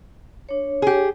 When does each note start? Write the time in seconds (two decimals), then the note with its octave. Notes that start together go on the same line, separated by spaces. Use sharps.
0.49 D4 C#5
0.82 G4 G#4